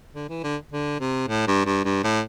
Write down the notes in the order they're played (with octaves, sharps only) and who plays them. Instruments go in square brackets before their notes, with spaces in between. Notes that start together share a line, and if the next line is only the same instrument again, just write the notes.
[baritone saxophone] D3
E3
D3
D3
C3
A2
G2
G2
G2
A2